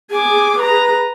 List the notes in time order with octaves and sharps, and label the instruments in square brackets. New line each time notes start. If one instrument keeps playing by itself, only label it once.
[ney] G#4 [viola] G#5 D6
[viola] B4 A#5